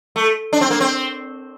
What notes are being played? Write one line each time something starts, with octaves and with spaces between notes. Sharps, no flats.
A3
D4
C4
A#3
C4